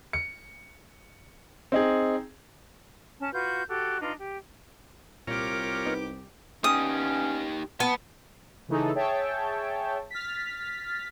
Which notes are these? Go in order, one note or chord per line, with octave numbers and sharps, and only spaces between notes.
C#7
C4 D#4 G#4
C#4 A5
F4 F#4 B4 G6
F#4 G4 A4
D4 D#4 F4 B4
G4
C2 A#2 F4 G4 A#4 C#5 D6
B3 D#4 B4
G2 B3 C#4 D#4 G4 D#6
A#3 B3 A5
C#3 E3 A3 D#4 G#4 A4
G#4 C#5 E5 G5 A5
F6 A6 B6